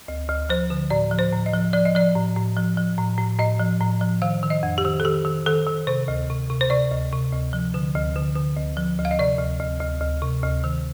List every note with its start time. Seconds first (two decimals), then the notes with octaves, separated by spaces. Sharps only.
0.08 D2
0.29 D2
0.50 F3 C5
0.70 D3
0.90 A2 D5
1.11 F3
1.19 C5
1.33 A2
1.46 D#5
1.53 F3
1.73 F3 D5
1.85 D#5
1.95 F3 D5
2.15 A2
2.36 A2
2.57 F3
2.77 F3
2.98 A2
3.18 A2
3.39 A2 D#5
3.59 F3
3.80 A2
4.01 F3
4.22 D#3 F5
4.43 D#3
4.50 D#5
4.63 F2
4.78 G4
4.85 D#3
5.00 A4
5.05 D#3 G4
5.25 D#3
5.46 D#3 A4
5.67 D#3
5.87 C3 C5
6.08 D2
6.30 C3
6.50 C3
6.61 C5
6.70 C3 D5
6.92 D2
7.12 C3
7.33 D2
7.53 F3
7.74 D3
7.95 D2
8.16 D3
8.36 D3
8.57 D2
8.77 F3
8.99 D2
9.05 F5
9.11 D#5
9.19 C3 D5
9.39 D2
9.60 D2
9.81 D2
10.01 D2
10.22 C3
10.43 D2
10.64 D#3